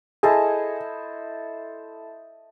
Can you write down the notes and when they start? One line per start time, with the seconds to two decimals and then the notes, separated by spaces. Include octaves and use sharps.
0.23 E4 G#4 A4 C5 D#5